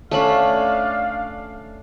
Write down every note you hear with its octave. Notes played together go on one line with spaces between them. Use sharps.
A3 C#4 D4 D5 F5 B5